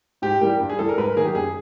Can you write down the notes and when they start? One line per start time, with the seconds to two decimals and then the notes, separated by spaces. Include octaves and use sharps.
0.22 G#2 G4
0.41 E3 G3 A#3 G4
0.60 G2
0.70 G#4
0.79 E3 G3 A4
0.89 A#4
0.97 G#2 B4
1.08 A#4
1.16 D#3 F#3 A#3 G#4
1.25 G4
1.35 F#2 G#4